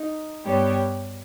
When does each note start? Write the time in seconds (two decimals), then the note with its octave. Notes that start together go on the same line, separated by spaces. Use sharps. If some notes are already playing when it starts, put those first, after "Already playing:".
Already playing: D#4
0.45 G2 G3 B3 G4 C#5